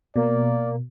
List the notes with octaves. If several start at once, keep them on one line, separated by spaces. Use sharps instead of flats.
B2 A#3 D5